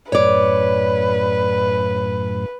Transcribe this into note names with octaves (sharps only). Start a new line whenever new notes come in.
F#2 A2 B4 C#5 D5